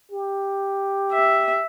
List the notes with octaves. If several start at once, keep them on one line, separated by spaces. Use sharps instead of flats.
G4
E5